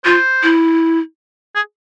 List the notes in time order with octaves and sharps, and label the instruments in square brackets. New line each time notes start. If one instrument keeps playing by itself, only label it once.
[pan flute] F4 [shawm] C5
[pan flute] E4
[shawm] G#4